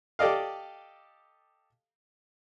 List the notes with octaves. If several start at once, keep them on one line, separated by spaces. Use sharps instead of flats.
G4 A4 D5 D#5 F5